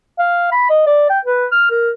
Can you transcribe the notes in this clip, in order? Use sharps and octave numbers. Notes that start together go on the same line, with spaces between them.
F5
B5
D#5
D5
G5
B4
F6
A#4